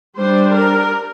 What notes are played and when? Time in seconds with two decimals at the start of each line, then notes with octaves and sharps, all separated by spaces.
0.17 G3 D4 C5
0.54 A#4